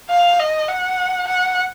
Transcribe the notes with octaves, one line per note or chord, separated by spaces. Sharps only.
F5
D#5
F#5
F#5